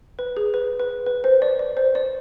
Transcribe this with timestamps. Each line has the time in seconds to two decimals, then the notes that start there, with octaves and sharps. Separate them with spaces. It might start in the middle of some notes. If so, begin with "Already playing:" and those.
0.19 B4
0.37 G#4
0.54 B4
0.80 B4
1.06 B4
1.24 C5
1.42 D5
1.59 D5
1.77 C5
1.95 D5